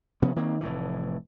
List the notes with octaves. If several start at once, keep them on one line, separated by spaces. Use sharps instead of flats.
C3 F3 B3 C#4
D#3 A#3 C4
F1 A2 E3